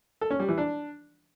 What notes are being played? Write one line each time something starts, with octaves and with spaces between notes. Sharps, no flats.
A4
C#4
G3
E3
D4